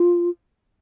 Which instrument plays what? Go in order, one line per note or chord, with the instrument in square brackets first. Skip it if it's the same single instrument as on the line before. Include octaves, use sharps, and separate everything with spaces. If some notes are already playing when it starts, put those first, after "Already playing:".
Already playing: [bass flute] F4